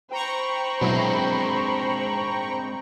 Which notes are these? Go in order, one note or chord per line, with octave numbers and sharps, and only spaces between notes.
C5 G5 A#5 B5 C#6
B2 F#3 G#3 C4 D4 E4